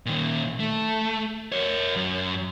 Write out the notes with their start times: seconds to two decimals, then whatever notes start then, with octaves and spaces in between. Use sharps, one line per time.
0.06 A#2 D#3
0.60 A3
1.52 A#4 C#5
1.96 F#2